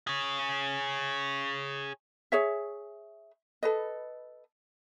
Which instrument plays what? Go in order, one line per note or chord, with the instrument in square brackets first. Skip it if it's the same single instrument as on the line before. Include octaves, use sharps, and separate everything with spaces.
[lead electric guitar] G#4 C#5
[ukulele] G#4 C#5 E5
A4 B4 D#5